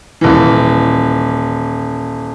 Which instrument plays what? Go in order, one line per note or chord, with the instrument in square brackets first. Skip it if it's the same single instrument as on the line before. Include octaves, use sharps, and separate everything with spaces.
[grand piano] D#1 E3